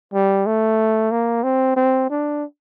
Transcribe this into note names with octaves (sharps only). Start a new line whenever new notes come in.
G3
A3
A#3
C4
C4
D4